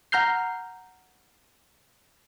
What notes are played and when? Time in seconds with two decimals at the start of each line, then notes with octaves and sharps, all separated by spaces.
0.12 F#5 A#5 F6 G6 C7